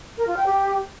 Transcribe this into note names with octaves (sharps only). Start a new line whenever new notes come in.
A#4
F4
G5
G4